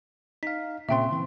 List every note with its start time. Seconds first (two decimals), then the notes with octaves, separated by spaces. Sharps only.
0.43 D#4 F5 B6
0.89 A#2 C#3 C4 E5 G5 C6
1.12 E3 C4